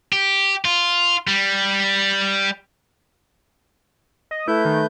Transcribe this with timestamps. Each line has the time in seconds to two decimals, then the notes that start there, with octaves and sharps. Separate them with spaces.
0.13 G4
0.65 F4
1.28 G3
4.31 D#5
4.48 A3 E4 B4 G6
4.65 D#3